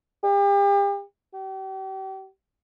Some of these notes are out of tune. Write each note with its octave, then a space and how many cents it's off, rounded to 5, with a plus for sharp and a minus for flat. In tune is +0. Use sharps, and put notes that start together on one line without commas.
G4 +35
G4 -40